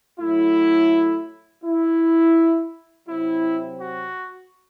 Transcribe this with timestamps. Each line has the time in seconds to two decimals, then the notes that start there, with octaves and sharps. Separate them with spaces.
0.20 A2 F#3 A3 E4
1.65 E4
3.09 C3 F#3 C4 E4
3.81 F#4